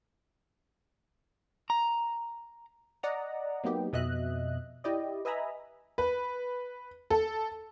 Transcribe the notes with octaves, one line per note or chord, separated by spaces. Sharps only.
A#5
D5 D#5 F#5 A#5
F#3 A#3 B3 D#4 G4
F2 B2 D#5 E5 F#6
E4 G4 D5 D#5
B4 D#5 E5 G#5 A#5 B5
B4
A4